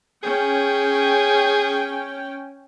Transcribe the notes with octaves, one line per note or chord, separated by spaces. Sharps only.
C#4 G#4 G5